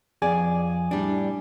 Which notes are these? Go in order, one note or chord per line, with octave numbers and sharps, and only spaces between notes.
F2 G#4 D5 G#5
A2 G3 D4